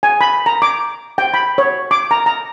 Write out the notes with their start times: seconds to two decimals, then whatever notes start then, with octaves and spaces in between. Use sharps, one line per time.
0.03 G#5
0.21 B5
0.46 A#5
0.62 D6
1.18 G5
1.34 B5
1.58 C#5
1.91 D6
2.11 A#5
2.26 A#5